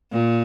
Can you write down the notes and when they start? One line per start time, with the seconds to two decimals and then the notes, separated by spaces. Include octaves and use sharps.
0.11 A#2